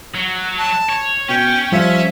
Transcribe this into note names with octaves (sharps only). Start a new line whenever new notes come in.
F#3
A5
C#5
B2 C#4 G5
F3 G3 C5 E5 F5